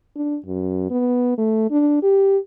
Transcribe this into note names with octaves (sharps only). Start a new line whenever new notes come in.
D4
F#2
B3
A3
D4
G4